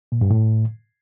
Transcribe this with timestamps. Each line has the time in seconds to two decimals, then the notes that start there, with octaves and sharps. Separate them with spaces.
0.12 A#2
0.21 G2
0.30 A2